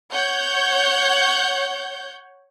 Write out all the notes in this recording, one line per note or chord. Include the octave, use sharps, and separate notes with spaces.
C#5 F#5 G6